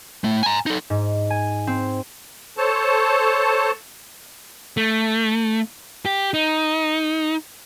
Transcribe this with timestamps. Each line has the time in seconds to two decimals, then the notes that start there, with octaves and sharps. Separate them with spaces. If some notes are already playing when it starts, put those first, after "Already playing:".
0.24 A3 E4
0.43 G#5 A#5
0.66 D#4 A4
0.90 G#2
1.30 G#5
1.67 C4
2.57 A4 C5 C#5 A5
4.77 A3
6.05 G4
6.34 D#4